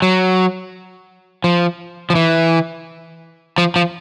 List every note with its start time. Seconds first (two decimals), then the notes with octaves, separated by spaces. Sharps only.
0.02 F#3
1.44 F3
2.10 F3
2.15 E3
3.58 F3
3.76 F3